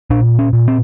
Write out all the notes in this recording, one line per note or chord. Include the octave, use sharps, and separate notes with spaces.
A#2 D4
C#4
A#2
C4